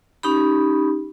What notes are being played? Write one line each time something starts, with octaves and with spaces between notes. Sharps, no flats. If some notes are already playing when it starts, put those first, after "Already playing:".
C#4 D#4 G4 B5